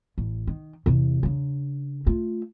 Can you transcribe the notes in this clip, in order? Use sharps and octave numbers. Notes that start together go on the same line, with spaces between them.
A1
D#3
E2 C3
C#3 D4
A3 F4